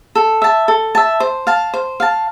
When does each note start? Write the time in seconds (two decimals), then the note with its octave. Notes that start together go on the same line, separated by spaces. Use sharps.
0.15 A4
0.42 E5 A5
0.68 A4
0.95 E5 A5
1.20 C5
1.47 F5 A5
1.74 C5
2.00 F5 A5